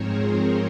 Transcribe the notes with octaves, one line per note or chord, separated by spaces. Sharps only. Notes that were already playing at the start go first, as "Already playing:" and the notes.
Already playing: G#2 F3 C4 G#4 A#4 C5 C#5